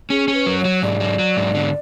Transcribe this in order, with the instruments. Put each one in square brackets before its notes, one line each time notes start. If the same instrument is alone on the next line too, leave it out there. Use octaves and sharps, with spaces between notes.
[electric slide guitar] C#4 [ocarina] G#4
[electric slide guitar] C#4
[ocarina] B4
[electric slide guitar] F#3
[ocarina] C#5
[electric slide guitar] F#3
[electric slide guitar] G#2 [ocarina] D5
[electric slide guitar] F#3
F#3
G#2
D3